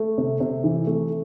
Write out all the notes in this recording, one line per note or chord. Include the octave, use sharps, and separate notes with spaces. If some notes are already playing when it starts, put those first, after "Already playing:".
Already playing: A3
C3
C3
E3
A3